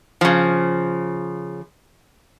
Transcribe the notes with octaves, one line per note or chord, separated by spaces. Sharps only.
C#3 F3